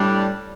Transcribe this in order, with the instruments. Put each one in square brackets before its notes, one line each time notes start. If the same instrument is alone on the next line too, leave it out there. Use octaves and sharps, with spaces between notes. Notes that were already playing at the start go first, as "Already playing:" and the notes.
Already playing: [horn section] A2 G3 D4